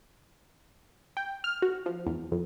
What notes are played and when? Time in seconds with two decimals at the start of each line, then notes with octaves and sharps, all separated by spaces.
1.17 G5
1.44 F6
1.62 F#4
1.86 F3
2.07 E2
2.32 F2